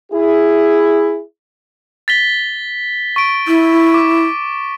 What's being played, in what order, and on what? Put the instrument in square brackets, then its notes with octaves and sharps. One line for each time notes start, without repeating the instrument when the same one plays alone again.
[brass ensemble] E4 G#4
[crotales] A6 B6 G7
C#6 D7
[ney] E4
[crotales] D6